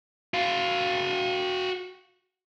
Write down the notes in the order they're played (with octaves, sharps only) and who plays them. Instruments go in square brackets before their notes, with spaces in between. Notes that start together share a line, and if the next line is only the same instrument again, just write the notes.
[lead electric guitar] F#4 F5